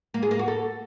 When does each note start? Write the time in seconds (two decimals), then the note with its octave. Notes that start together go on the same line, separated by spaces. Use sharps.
0.14 A#3
0.23 G#4
0.31 A#3
0.39 F#4
0.48 A4